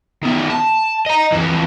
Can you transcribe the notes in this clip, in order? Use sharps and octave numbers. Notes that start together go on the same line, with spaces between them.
D#3 B3
A5
D#5 A#5
F2 E3